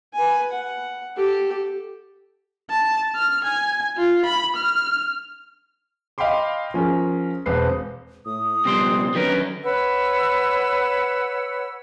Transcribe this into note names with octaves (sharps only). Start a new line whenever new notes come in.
B4 G#5
F#5
G4 A4
A5
F6
G#5
F4
B5
F6
D#5 F5 G5 B5 C6 D6
F3 C#4 G#4 A#4
E1 C4 B4 C7
A2 D#6
C#2 B2 G3 C4 C5 C6
D3 D#3 F#3 C#4 G4 A#4 B4
B4 C#5 F#5 E6